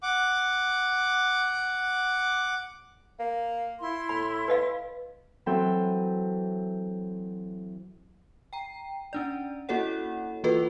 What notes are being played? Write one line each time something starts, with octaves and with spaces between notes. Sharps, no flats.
F#5 D6
A#3
E4 C6
A2 B5
B4 D#5 F5
E3 F#3 C4 A4 G5 C6
G5 A#5
C#4 D4 D5
A#3 E4 F#4 A4 C#5 F#5
E3 A#3 F4 F#4 A4 B4